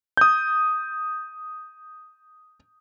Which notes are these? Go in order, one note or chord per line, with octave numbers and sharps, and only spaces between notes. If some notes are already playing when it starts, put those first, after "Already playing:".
D#6 G6